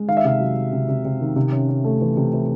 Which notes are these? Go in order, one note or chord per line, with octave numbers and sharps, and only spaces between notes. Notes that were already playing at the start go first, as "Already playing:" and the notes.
Already playing: G#3
D#3 F5
E5
C3 F5
F#3
F#3
C3
C3
C3
D#3
C3
C#4
C#4
A3
E3
C3
E3